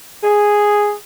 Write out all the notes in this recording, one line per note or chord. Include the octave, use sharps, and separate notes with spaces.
G#4